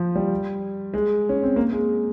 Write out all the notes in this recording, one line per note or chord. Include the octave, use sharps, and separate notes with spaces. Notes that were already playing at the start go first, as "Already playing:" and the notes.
Already playing: F3
G3
G#3
C#4
C4
A#3
G#3